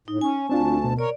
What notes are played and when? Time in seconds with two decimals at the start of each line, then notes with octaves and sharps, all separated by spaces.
0.08 A2 D#4
0.21 C#4 G#5 C#6
0.49 D2 C4 D4 F4 A5
0.84 B2
0.99 A#4 C#5 D5